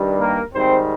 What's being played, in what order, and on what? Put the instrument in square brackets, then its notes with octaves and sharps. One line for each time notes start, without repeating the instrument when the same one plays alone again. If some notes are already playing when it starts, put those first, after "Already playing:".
Already playing: [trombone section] G2 D#3 G3
A#3 A#4
G#2 D#3 G3 C4 C5